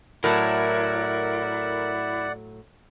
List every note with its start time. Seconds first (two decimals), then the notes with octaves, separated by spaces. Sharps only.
0.24 A2 F#3 E4 A#4 D5 F#5